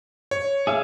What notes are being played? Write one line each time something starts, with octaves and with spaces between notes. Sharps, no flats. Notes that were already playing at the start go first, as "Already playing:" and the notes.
C#5
G#4 E5 F5